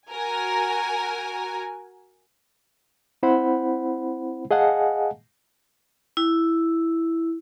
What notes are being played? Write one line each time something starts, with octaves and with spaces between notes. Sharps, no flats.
F#4 A#4 G#5
C4 E4 C5 F#5 B5
G#4 D#5 F5 F#5 G#5 A5
E4